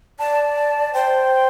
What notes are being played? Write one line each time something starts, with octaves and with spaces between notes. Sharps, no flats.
D5 A5
A5
C5 G5